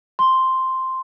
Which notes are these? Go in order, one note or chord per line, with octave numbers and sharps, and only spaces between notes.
C6